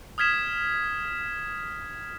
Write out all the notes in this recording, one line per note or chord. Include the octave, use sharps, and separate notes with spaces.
D#6 F6 G#6 B6 E7